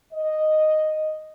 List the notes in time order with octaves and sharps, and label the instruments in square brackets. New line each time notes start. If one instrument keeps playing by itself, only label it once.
[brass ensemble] D#5